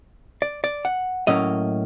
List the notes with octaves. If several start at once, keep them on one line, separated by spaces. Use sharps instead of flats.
D5
D5
F#5
A2 F#3 A#3 C#4 D#5